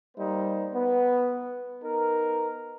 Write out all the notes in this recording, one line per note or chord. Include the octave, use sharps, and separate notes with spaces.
G3 A#3 D#4 C5
B3
B3 D#4 A#4